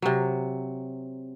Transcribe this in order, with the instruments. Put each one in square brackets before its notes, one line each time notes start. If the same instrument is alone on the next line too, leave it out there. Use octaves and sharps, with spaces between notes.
[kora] C3 F#3